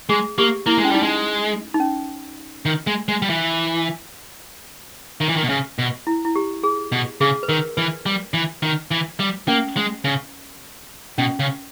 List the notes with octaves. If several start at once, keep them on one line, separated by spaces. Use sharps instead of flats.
G#3 G#4
A#3 G4
A#3 E4
G#3
C#4
G3 D#4
G#3
D#4
C#4
D#3
G#3
G#3
G3
E3
D#3
E3
D#3
B2
C#3
B2
E4
E4
G4
G#4
B2
C#3 G#4
B4
D#3 A#4
E3 B4
G3
E3
D#3
E3
G3
A#3 C#4
G#3
C#3
B2 C#4
C#3